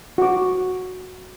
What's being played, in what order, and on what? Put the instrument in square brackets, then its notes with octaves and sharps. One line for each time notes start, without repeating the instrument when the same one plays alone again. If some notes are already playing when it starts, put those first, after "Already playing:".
[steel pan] F#4 D6